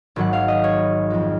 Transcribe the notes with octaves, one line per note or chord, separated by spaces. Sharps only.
G#1 G#2 F#3 F#5
F5
D#5
C#5
F2 F3 G#3